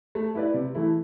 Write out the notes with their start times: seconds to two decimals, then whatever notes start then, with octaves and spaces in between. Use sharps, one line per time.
0.15 A3
0.35 E4 G4 B4 D5
0.54 C3
0.75 E3 A3 E4